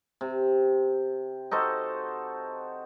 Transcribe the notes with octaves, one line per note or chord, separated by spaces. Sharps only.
C3
D#4 F#4 A4 C5